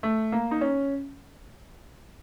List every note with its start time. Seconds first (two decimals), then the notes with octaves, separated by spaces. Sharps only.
0.03 A3
0.32 A#3
0.51 D#4
0.61 C#4